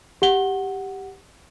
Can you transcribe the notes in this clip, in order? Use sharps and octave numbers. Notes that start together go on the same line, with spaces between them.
G4 F#5 G7